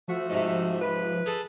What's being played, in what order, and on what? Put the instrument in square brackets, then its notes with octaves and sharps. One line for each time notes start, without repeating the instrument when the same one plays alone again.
[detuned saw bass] F3 [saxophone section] A3 F#4
[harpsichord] G#2 C3
[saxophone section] B4
[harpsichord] G#4 A4